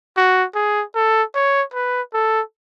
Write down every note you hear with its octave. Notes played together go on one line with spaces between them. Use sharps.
F#4
G#4
A4
C#5
B4
A4